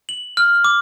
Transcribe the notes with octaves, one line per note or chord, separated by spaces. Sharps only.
F#7
F6
D6